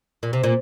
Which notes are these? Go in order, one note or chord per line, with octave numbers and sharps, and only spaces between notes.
A#2
C3
A#2